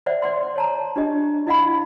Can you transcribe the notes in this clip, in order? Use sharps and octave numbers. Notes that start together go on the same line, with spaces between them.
C5 D5 E5 F#5
D5 F#5 C6
C#5 A5 A#5
D4 G4 D#5
E4 D#5 F5 F#5 B5